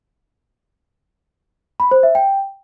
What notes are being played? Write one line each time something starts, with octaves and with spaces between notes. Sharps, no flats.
B5
C5
E5
G5